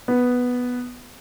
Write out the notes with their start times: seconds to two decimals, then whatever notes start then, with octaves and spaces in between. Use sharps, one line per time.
0.08 B3